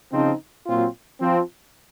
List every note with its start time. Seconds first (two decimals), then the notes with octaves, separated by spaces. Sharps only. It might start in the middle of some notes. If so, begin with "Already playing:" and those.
0.12 C#3 F3 C4 D#4
0.66 A#2 F#3 C4 F4
1.21 F3 C4 F4